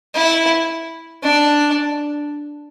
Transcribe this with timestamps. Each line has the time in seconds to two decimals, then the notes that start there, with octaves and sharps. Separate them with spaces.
0.15 E4
1.23 D4